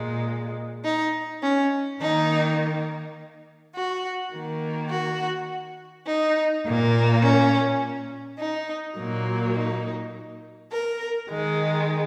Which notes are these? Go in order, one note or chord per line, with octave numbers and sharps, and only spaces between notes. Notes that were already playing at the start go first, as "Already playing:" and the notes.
Already playing: A#2 G#3
D#4
C#4
D#3 A#3 D#4
F#4
D#3 A#3
F#4
D#4
A#2 A#3
C#4
D#4
A#2 F#3 A#3
D#4
A#4
D#3 G#3